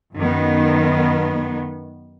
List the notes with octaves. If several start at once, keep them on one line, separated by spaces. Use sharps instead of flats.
F#2 D#3 B3